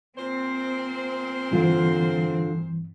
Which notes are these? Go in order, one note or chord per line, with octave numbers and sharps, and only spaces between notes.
A#2 C4 C5
G2 D3 E3 F4